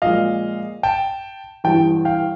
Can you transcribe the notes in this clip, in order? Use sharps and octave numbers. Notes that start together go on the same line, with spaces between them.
A#2 F3 G#3 D#5 F5
G5 A5
A1 G2 E3 G5 A5
F5 G5